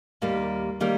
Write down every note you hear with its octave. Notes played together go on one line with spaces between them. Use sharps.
D#2 D#3 G3 A#3
D#3 G3 A#3